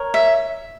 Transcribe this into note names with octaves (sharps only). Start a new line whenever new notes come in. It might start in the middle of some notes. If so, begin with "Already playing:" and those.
Already playing: A#4 C#5
E5